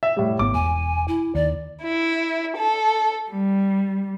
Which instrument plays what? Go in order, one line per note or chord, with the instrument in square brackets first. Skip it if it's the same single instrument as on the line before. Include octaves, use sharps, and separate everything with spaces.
[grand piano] E5
A2 G3
[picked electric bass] G#1 B3 [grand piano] D6
[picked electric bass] E1 E2 [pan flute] G#5
[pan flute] E4
[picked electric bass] D#2 [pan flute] D5
[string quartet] E4
A4
G3